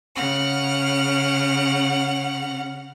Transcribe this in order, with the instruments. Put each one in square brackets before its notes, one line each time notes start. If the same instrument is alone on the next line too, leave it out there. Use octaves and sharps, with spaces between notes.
[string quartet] C#3 F#5 F6